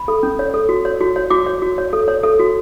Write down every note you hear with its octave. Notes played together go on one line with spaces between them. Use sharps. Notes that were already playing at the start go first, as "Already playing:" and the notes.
Already playing: B5
A4
C#4
C#5
A4
F#4
C#5
F#4
C#5
F#4 D6
C#5
F#4
C#5
A4
C#5
A4
F#4